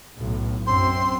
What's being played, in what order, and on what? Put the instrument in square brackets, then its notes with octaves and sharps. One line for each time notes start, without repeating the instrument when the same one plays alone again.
[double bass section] B1 A2
[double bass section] F#2 C4 [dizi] C6